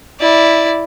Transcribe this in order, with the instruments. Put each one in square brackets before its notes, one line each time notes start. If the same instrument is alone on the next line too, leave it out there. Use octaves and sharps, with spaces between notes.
[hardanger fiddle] E4 [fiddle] D5